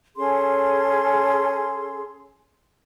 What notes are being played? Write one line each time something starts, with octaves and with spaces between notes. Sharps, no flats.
C#4 G#4 A4 C6